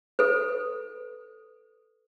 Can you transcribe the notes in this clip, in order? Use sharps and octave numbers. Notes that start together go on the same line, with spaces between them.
A4 B4